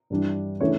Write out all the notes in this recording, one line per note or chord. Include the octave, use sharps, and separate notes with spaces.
G2 E3 G3 D4
C#3 E3 A3 D4 C#5